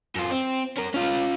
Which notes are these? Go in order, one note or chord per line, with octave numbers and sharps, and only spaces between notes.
F#2 F4
C4
C#4 A#4
C#4 F4